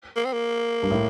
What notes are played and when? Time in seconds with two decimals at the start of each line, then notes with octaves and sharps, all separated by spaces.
0.16 A#3
0.25 C4
0.33 A#3
0.83 G2
0.91 A2